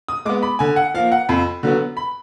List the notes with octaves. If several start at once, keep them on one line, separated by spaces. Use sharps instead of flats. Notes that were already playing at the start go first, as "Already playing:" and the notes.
D#6
G#3 B3 D6
B5
D3 G#5
F#5
F3 A#3 F5
F#5
F2 B5
D3 F#3 B3
B5